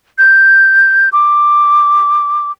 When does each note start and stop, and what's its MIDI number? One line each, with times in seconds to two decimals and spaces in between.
0.18 1.09 91
1.12 2.52 86